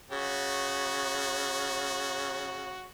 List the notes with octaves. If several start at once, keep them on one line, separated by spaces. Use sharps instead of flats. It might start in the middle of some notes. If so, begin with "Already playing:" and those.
C#3 F#4